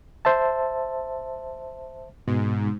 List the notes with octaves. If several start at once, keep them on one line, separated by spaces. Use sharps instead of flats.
C5 E5 A5
G#2 B2